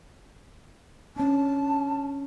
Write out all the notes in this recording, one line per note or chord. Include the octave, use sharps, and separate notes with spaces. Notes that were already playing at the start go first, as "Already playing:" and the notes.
C#4 D4 A5